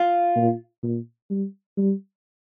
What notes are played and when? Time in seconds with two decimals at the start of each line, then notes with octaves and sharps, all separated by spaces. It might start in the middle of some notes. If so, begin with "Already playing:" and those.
Already playing: F4
0.36 A#2
0.83 A#2
1.30 G3
1.78 G3